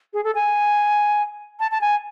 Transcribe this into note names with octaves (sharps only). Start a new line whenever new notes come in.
G#4
A4
G#5
A5
A5
G#5